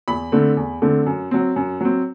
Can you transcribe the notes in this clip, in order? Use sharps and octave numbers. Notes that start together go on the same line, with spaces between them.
E2 B5
D3 A3 C4
E2
D3 A3 C4
F#2
F#3 C4
F#2
F#3 C4